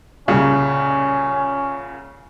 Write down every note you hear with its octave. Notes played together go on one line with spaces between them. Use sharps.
C2 A#2 C#3 C#4